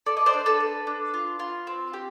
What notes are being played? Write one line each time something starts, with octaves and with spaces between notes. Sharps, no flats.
A4 D5
D#5
C5 D5
D4
A4 B4
A4
D4
F4
F4
C4
G4